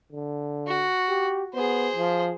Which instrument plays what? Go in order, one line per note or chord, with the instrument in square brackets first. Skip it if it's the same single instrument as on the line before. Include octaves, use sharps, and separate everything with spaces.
[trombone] D3
[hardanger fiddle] F#4
[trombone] G4
[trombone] B3 [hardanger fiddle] G#4 C5
[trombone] F3